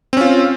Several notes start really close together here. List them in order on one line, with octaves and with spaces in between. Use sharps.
C4 C#4 F4